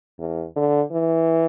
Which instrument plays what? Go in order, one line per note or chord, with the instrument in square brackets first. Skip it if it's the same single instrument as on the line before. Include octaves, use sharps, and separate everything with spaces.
[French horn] E2
D3
E3